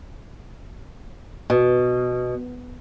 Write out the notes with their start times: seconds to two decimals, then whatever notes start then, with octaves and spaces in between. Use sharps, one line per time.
1.50 B2